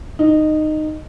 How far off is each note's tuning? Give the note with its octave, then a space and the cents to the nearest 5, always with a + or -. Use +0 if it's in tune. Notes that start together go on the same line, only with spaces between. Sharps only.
D#4 -15